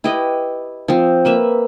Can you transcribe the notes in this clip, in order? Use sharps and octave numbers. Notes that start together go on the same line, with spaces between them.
E4 G4 B4 D#5
F3 C4
A#3 B4 E5